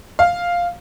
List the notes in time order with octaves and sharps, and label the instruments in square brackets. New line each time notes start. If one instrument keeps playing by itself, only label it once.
[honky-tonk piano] F5